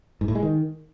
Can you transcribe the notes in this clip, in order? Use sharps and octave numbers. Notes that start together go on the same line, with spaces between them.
G#2
A2
G#3
D#3